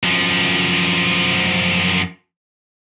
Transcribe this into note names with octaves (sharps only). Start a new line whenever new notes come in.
F#2 F3